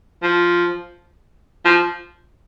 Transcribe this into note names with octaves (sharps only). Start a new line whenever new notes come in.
F3
F3